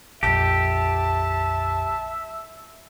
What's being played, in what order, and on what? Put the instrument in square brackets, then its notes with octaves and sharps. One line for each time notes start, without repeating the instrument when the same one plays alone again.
[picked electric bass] A#1 F2 [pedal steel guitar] G4 [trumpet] E5 [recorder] A5